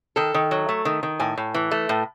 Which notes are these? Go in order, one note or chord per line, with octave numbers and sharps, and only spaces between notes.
D#3 A4
D#3
F#3
A3
D#3
D#3
A2 G#5
A2
E3
A3
A2